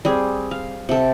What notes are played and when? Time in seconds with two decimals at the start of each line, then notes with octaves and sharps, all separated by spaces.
0.05 G3 C4 G#4
0.51 F5
0.89 C3 A4